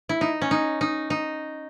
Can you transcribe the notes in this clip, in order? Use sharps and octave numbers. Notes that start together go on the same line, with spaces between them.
E4
D#4
C#4
D#4
D#4
D#4